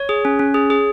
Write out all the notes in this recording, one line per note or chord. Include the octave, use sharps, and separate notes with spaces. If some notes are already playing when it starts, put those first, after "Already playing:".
Already playing: C#5
G#4
C#4
C#4
G#4
G#4